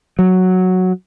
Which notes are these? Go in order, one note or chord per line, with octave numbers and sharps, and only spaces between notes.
F#3